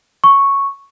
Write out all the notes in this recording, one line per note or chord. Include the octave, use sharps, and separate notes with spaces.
C#6